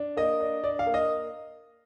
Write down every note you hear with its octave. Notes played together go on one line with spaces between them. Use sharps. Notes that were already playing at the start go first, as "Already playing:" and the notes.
Already playing: D4
A#3 D#5
D4
D4 D5
F5
A#3
D#5